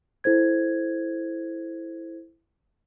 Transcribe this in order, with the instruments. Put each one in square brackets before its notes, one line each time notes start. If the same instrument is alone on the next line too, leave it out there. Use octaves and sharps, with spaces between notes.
[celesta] E4 A4 C5 G#6